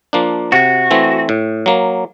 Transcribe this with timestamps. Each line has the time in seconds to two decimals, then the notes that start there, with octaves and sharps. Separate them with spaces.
0.13 F3 A#3 D4
0.52 C3 F#4
0.91 E3 A3 C4
1.29 A2
1.66 F#3 A#3